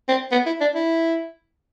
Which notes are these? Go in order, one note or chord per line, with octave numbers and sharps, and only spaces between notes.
C4
B3
E4
D4
E4